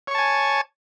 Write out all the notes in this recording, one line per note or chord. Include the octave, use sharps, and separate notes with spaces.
C#5 G#5 A5 C#6